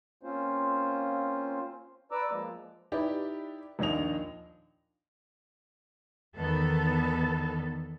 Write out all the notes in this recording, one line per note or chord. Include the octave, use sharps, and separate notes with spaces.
A#3 C4 C#4 F4 C5
B4 D5 A#5 D6 E6
F3 G#3 A#3
D#4 E4 G4 B4 D5
A#1 D#2 D4 D#5 F7
E2 D#3 B3 A4